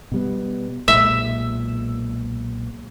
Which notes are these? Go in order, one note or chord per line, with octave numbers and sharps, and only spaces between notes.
B2 G3 B3
B1 A#2 G#3 E5